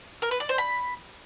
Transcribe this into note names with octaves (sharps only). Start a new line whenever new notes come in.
A#4
B4
D5
C5
B5